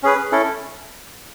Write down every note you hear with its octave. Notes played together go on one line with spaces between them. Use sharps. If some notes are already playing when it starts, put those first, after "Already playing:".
C#4 G#4 B4
C#4 E4 A4